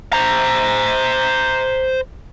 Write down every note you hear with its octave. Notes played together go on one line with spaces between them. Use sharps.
C5 A#5